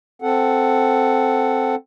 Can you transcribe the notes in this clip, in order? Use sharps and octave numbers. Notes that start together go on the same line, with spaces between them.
C4 A4 F#5